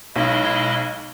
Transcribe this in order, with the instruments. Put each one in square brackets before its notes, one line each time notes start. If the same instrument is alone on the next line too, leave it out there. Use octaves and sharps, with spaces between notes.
[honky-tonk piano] B1 [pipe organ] G#3 E4 D#5